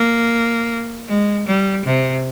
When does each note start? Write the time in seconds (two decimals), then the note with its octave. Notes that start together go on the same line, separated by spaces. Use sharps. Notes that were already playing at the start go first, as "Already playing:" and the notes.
Already playing: A#3
1.09 G#3
1.47 G3
1.85 C3